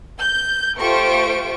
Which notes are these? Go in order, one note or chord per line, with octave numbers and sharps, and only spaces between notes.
G6
A3 F4 G4 C5 C#6 D7